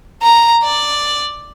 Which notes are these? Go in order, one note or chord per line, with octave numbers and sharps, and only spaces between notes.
A#5
D5